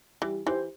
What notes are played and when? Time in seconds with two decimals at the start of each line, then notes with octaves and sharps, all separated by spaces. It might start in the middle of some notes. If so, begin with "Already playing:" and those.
0.22 E3 G3
0.46 E3 E4 G4 C5